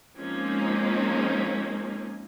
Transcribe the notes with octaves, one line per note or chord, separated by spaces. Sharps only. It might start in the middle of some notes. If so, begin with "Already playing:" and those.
F3 G#3 A#3 C4 C#4 D#4